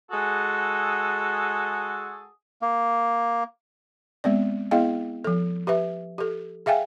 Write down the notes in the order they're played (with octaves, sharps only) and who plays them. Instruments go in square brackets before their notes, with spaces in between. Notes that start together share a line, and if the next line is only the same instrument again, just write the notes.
[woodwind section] G#3 F#4 G#4 A4
[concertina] A#3
[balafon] G#3 B3 C4 D5
B3 E4 G#4 D#5 F5 G5
F3 A4
G4 B4 E5
G4 A4
G#4 E5 F5 G5 G#5